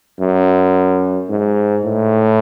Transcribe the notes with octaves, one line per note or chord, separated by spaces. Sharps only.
F#2
G#2
A2